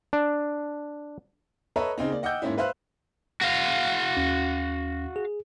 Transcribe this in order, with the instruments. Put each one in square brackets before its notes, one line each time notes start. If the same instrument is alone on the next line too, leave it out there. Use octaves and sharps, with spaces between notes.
[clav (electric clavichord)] D4
[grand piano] A4 B4 C#5 D#5 E5 A#5
C#3 C4 D#4
A#3 D5
D#5 F#5 G5 D6 E6 G6
G#2 A#3 C#4 E4
B4 C5 E5 F5 F#6
[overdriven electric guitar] F#4 F5
[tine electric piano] D#2 C#4
G#4